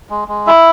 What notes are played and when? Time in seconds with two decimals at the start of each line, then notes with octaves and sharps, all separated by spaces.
0.10 G#3
0.28 G#3
0.47 E4 E5